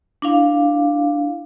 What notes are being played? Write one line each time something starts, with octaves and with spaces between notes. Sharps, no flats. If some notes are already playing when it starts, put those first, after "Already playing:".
D4 E4 F5